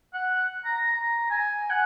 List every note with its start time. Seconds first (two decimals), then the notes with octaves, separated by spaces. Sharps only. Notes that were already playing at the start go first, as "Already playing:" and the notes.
0.14 F#5
0.65 A#5
0.91 A#5
1.30 G#5
1.70 F#5